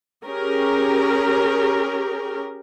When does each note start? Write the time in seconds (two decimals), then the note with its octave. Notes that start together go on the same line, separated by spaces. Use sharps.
0.25 C#4 G4 G#4 A#4